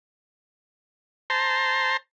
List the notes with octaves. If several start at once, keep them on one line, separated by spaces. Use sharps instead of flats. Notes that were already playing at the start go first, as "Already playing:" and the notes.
C5 A5 A#5 C6